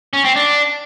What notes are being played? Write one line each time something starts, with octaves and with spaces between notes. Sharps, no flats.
C#4
C4
D4